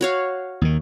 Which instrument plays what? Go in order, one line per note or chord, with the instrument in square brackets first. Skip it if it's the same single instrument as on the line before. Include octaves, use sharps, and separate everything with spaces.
[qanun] F#4 C#5 F5
[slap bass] D#2 D#3